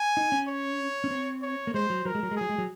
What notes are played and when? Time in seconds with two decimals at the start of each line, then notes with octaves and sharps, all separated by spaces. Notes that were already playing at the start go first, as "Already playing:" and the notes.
Already playing: G#5
0.17 D#4
0.32 C#4
0.48 C#5
1.04 C#4
1.11 C4
1.42 C#5
1.67 A#3
1.74 G#3 C5
1.90 F#3
2.05 F#3 A#4
2.15 G#3
2.23 F#3
2.31 G#3
2.37 F#3 G#4
2.49 G#3
2.58 F#3